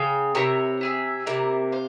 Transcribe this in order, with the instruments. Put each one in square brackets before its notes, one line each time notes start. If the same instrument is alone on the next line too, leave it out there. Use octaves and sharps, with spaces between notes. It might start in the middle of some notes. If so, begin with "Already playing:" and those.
Already playing: [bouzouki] C#3 [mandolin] G#4 C#5 G5
[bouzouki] C3 [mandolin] E4 A#4 C#5
[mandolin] E4 G#4 E5
[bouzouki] C3 [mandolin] A#3 E4 A#4
[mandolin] C5 F5